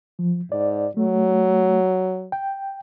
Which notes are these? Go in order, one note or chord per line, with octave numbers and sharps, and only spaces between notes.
F3
G#2 D5
F#3 A3
G5